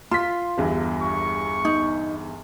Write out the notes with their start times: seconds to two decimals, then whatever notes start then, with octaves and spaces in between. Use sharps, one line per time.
0.11 F4 C6 B6
0.57 G1 E2 G2
1.02 C#6
1.65 D#4